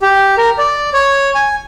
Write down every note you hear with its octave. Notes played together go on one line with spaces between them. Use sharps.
G4
A#4
D5
C#5
G#5